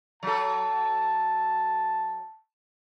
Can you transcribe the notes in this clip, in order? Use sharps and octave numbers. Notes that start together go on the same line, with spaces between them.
F#3 A4 A5